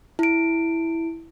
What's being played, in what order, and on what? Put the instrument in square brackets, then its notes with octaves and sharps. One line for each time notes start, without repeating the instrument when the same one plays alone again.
[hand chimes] E4 D7